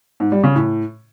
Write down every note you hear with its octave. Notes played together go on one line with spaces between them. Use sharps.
G#2
G3
C#3
A2